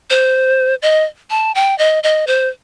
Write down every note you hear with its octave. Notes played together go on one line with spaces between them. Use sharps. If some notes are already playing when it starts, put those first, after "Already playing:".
C5
D#5
A5
G5
D#5
D#5
C5